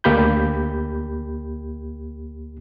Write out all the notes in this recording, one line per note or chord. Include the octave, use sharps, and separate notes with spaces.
D2 A#3 G4 B5 G6